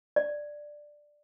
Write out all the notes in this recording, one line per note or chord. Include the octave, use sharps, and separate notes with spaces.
D5